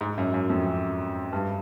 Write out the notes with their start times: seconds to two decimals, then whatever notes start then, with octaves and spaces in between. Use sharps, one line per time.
0.01 G#2
0.18 F#2
0.34 F#2
0.49 F2
0.66 F#2
1.33 G2